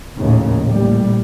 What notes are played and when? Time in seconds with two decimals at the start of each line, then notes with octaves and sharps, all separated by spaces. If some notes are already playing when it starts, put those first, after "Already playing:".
0.18 A#1 D#2 A2 C#3
0.65 A#1 A2 G3